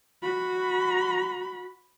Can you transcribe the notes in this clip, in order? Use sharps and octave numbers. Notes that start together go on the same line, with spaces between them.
F#4 B5